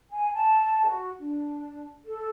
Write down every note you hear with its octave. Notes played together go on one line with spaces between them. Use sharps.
G#5
A5
F#4
D4
A4